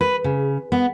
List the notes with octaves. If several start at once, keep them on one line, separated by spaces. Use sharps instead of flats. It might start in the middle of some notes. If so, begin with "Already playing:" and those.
B4
C#3
B3